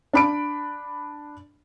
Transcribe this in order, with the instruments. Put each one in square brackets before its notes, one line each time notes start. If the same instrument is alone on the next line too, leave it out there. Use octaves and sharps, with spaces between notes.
[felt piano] D4 B5 D7